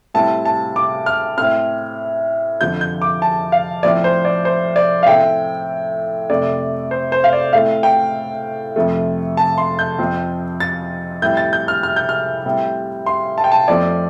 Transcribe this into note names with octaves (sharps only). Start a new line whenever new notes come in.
A2 G3 C4 A5
A5
D6
F6
A2 A3 C4 F6
F2 D3 F3 G6
G6
D6
A5
F5
A2 F3 C4 D5
C5
D5
C5
D5
F5
A2 A3 C4 G5
F2 C3 A3 D5
C5
C5
F5
D5
A2 A3 C4 F5
G5
F2 C3 F3 A3
A5
C6
G6
F2 F3 C4
A6
A2 G3 C4 G6
A6
G6
F6
F6
G6
F6
A2 G3 C4
C6
A5
G5
A5
F2 F3 A3 C4 D5